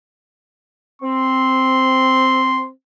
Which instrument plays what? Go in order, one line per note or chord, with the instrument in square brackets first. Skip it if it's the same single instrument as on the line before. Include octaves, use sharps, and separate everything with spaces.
[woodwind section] C4 [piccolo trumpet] C6